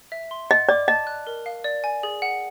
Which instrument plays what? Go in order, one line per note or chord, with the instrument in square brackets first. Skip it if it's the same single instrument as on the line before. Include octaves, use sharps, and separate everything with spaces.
[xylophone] E5
C6
[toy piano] D#5 [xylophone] F#5
[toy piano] D5 [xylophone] D6
[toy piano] D#5 [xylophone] A5
[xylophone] F#6
A#4
F5
D5
G#5
G#4
F#5